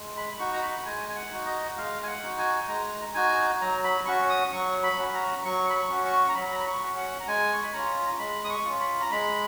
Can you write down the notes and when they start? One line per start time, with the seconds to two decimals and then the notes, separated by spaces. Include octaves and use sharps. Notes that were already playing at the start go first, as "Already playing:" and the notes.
Already playing: G#3
0.17 B5
0.39 D#4 F#4 C#6
0.53 A#5
0.62 B5
0.85 G#3 G#5
1.09 G#5
1.15 F#5
1.31 D#4 F#4
1.46 D#5
1.77 G#3 F5
2.03 G#5
2.07 F#5
2.23 D#4 F#4
2.38 G#5
2.68 G#3 A#5
3.14 D#4 F#4 G#5
3.61 F#3 A#5
3.84 B5
4.06 C#4 F#4 C#6
4.29 D#6
4.52 F#3 C#6
4.83 B5
4.98 C#4 F#4
5.14 A#5
5.44 F#3 C#6
5.70 B5
5.75 C#6
5.89 C#4 F#4
6.05 C#6
6.29 A#5
6.35 F#3 B5
6.52 A#5
6.59 B5
6.66 C#6
6.81 C#4 F#4
6.96 F#5
7.20 A#5
7.27 G#3 G#5
7.53 C#6
7.63 B5
7.73 C#4 F4 A#5
8.19 G#3 B5
8.44 D#6
8.50 C#6
8.65 C#4 F4
8.80 B5
9.01 A#5
9.11 G#3 B5